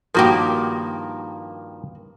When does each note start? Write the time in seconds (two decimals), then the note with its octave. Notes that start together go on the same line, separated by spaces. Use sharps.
0.15 G2 D#3 F3 A#3 F#4 G4